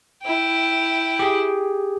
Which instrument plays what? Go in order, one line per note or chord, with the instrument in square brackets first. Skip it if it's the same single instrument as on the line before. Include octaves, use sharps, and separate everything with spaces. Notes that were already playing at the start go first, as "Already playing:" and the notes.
[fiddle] E4 G5
[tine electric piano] G4 G#4